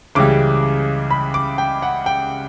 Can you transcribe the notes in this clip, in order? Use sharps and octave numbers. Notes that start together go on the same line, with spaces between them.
C#2 C#3 E3 G3 D6
B5
D6
G5
F#5
G5